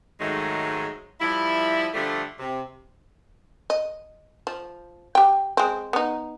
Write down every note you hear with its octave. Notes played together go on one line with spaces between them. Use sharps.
G#2 D#3 F#3 G#3 A3
F3 G3 E4
D3 F3 G3 A3
C3
D#5
F3
G4 G5
G#3 C4
B3 D#4